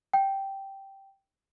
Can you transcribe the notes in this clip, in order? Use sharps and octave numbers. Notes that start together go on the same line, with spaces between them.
G5